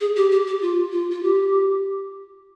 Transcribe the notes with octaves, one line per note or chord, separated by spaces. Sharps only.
G#4
G4
G4
G4
F4
F4
F4
G4